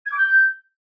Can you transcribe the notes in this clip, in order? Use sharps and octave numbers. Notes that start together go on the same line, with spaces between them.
G#6
D6
G6